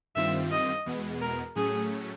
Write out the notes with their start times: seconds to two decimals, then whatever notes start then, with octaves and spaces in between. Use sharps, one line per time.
0.16 G2 D#3 G3 C4 F4 E5
0.51 D#5
0.86 E2 B2 G#3 B3
1.21 A#4
1.56 A2 F#3 A3 C#4 G#4